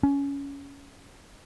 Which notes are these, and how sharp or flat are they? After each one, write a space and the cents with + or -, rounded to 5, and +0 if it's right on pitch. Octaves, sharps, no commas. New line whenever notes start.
C#4 +15